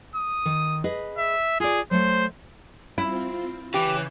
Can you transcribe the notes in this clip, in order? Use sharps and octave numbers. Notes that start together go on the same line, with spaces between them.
D#6
D#3
G#4 B4 D#5
E5
F4 G#4 D5
F#3 A3 C5
C4 E4 F4
C#3 E3 G4 C#5 G6